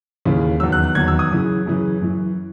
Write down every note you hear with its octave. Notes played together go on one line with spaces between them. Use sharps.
D#2 C#3 E3
E2 D#3 F#3 E6
F#6
F#6
E2 D#3 F#3 G#6
E6
D#6
F#2 C#3 E3
F#2 C#3 E3
F#2 E3